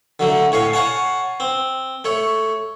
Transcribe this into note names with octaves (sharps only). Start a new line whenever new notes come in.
D3 F#3 A3
A2 C#5 F5 G#5
C#5 F5 F#5 G#5 A5
C4
A3 C#5